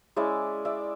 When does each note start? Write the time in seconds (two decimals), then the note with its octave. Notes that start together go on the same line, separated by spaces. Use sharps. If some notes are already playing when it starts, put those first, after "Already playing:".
0.16 G#3 C#4 E4 D5 E5
0.65 D5 E5